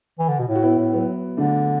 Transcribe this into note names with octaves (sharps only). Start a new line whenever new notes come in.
E3
D3
B2
A2 E4
F#4
B3 E4
A2
F#3 B3
D3 A3 D4